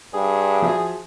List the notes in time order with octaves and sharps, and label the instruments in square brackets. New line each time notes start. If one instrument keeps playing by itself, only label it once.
[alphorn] G2 [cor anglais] G#4
[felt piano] F3 F#4 E5